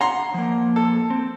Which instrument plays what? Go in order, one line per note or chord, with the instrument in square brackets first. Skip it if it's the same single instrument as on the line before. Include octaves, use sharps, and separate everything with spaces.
[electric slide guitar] F#5 [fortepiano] A#5 C6
[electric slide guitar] F3 A#3
[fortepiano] A4
[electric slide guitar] C4